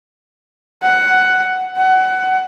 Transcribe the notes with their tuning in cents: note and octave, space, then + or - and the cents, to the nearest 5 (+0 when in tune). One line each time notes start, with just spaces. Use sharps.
F#5 +10
F#5 +20